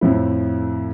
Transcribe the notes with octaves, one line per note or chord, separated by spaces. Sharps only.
F2 A2 F3 E4